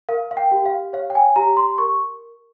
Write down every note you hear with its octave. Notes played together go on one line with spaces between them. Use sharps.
A#4 F5
F5
G5
G4
F5
C#5 F5
G5
G#5
G4 A#5
C6
A#4 C#6